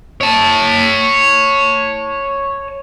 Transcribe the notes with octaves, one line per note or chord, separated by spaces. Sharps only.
C#5 A5